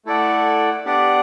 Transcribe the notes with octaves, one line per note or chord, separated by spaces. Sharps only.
A3 E4 A4 D5 F#5
B3 D4 G4 D5 F#5